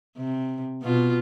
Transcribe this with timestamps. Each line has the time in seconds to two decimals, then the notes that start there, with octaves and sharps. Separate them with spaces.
0.17 C3
0.82 B2 F4